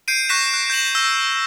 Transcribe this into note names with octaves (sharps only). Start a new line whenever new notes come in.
G6 C7 D7 D#7
C#6 F#6 A#6 B6 E7
F#6
G6 A#6 E7 F#7
E6 G6 A#6